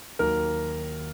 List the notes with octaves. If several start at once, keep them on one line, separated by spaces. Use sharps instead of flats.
D#2 D#3 F#3 A#3 A#4